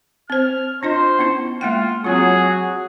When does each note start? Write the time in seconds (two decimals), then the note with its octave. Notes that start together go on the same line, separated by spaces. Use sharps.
0.30 C4 C5 F6
0.83 D4 F4 C5 D#5
1.19 B3 C#4 E4
1.61 G#3 A#3 F4 G5
2.04 F#3 C4 F4 F#4 G#4